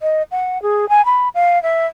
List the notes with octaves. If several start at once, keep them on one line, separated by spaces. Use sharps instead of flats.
D#5
F#5
G#4
G#5
B5
F5
E5